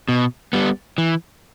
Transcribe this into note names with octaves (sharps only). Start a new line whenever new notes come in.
B2
G3 B3
E3